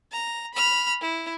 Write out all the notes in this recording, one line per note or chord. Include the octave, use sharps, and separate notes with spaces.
A#5
B5 F6
E4